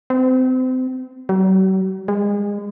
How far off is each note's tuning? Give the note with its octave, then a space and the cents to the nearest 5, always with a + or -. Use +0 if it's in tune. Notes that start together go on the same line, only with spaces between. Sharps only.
C4 -30
F#3 +45
G#3 -30